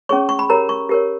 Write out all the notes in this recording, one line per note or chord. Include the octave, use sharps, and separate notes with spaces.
C#4 G#4 C#5 C#6
C#6
B5
G4 A#4 C#5 A#5
C#6
G4 A#4 C#5